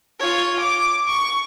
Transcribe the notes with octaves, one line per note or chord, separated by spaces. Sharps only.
F4 C#5
D6
C#6